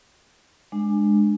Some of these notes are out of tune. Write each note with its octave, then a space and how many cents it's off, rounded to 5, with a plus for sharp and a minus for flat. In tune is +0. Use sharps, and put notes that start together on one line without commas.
G#3 +0 D4 +20